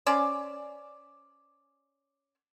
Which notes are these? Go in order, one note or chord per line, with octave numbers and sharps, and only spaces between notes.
C#4 C5 D5